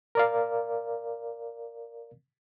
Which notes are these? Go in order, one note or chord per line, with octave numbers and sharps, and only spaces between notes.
A#4 D5 F5